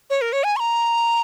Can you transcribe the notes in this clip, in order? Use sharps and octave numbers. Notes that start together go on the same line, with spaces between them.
C#5
A#4
C#5
G#5
C#6
A#5